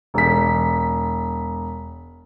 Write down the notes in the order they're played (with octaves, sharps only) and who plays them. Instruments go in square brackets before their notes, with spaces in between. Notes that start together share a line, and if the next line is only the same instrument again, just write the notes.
[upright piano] E1 B6